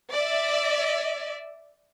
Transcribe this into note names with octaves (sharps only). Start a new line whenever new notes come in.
D5 E5